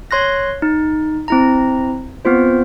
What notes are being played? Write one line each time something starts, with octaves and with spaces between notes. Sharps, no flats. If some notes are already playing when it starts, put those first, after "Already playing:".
C#5 C6 F#6 A#6
D#4
C4 E4 A#5
B3 C4 F4 C5